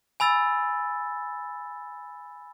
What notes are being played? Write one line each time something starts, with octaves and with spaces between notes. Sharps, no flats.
G#5 B5 E6 A6